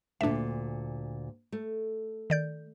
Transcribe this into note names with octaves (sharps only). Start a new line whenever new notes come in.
D2 A#2 D4 E5
A3
D#3 D5 G6